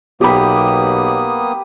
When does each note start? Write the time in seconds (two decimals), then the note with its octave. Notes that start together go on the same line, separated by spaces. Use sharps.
0.21 B1 A#3 B3 G4 B5 D#6